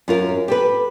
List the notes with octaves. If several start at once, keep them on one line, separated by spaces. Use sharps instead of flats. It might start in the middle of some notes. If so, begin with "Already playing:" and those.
F#2 F4 A#4
G4 A4 B4